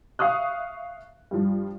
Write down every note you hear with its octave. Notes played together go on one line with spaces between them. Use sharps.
E5 F5 C#6 D#6 F#6
G2 F3